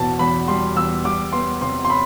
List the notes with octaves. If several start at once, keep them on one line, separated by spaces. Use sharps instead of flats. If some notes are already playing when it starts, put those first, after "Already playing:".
Already playing: E2 B2 A5
E2 B5
G3 C6
E2 E6
G3 D6
B3 C6
C3 C6
C6
B5